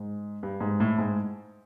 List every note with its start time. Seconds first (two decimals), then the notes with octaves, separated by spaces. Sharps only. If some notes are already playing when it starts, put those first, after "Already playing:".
Already playing: G#2
0.43 G2
0.60 G#2
0.80 A2
0.98 G#2